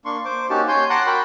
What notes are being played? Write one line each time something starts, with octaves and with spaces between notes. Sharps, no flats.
A#3 D4 C6 C#6
C5 D6
A#3 C#4 D#4 F#4 G4 A5
C#5 G#5 C6 G6
F#5 A5 A#5 C6 D6 F#6
F#4 A#4 G5 B5 D6